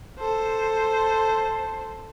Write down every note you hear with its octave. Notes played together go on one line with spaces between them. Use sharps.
A4 C5